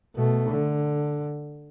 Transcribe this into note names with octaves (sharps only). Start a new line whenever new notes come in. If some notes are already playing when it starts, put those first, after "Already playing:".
B2 A3
D3